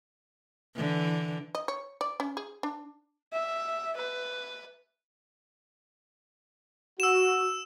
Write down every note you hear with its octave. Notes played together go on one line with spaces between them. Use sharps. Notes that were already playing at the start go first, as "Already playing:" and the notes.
D3 E3
D#5
C#5
D5
C#4
G#4
D4
E5
B4
F#4 E6 E7